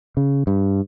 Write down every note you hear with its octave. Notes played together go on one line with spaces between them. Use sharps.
C#3
G2